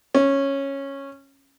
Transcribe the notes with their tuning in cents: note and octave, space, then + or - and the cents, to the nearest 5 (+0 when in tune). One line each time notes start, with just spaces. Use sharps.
C#4 -10